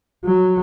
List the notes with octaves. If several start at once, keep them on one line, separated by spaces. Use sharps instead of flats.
F#3